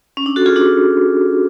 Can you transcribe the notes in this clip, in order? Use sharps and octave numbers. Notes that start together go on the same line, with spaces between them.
C#4
D4
F#4 A4
F4 G#4
D4 F#4